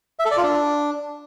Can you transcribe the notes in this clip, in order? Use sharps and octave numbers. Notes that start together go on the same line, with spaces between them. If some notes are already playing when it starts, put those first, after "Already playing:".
E5
A4
D5
F4
D4